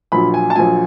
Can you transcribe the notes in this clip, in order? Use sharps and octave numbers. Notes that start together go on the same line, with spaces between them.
A#1 A#2 F#3 B5
G#5
A5
A#1 A#2 F#3 G#5